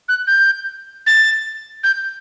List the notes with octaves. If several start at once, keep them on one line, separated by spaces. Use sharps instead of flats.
F#6
G6
A6
G6